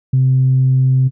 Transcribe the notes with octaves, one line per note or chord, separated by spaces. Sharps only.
C3